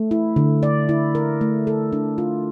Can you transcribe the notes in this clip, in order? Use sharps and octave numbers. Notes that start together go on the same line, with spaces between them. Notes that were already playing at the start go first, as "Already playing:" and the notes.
Already playing: A3
E4
D3
D5
E4
A#4
A3
A4
D4
F4